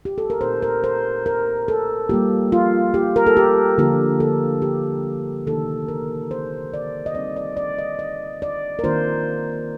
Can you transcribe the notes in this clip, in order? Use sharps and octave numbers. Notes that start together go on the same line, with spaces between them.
G4
A4
A#4
A#2 A3 C4 D#4 C5
A#4
C5
A#4
A4
G3 A#3 F4 G4
F4
G4
A#4
A4
G4
D3 F3 A#3 D4 F4 G4
A4
G4
C3 D#3 A#3 D#4 A4
A#4
C5
D5
D#5
G3 C4 D#4 D5
D5
D5
D#5
D#5
D5
A#4
D#3 A#3 D4 F4 C5